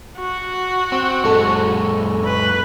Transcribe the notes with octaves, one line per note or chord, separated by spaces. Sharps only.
F#4
C4
F#2 A#2 G#3 A4 C#6
B4